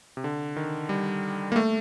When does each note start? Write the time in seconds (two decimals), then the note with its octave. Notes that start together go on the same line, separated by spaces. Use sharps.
0.17 C3
0.24 D3
0.56 D#3
0.89 G3
1.52 A#3
1.56 A3